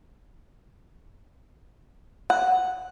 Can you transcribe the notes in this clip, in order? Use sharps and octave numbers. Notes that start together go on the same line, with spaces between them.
F#5